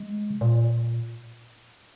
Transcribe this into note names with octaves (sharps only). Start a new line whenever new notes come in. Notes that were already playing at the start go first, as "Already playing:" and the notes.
Already playing: G#3
C3
A#2